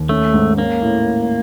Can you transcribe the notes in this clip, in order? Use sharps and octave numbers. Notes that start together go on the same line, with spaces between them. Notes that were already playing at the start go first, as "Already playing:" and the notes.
Already playing: D#2
A3 C#4
G#2
A#3 C#4
A2